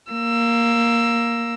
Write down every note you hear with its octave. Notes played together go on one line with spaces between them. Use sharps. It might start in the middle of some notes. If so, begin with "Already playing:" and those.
A#3 E6